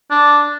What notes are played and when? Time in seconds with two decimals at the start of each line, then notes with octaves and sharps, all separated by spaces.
0.11 D4